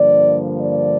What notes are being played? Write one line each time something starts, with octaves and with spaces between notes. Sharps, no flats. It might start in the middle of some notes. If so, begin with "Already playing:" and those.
Already playing: G2 D3 F3 A#3 D5
D5